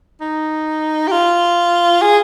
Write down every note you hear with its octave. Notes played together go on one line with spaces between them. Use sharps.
D#4
G4
F4
G#4